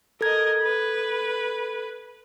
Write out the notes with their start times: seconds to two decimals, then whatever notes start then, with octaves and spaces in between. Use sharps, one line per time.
0.21 A4 A#4 D#5 G#6
0.62 B4